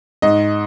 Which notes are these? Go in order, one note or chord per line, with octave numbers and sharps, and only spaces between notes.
G#2 D#5